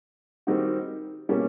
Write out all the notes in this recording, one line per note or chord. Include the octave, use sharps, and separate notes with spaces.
D#3 G3 C4 D#4 F#4
B2 G3 A#3 C#4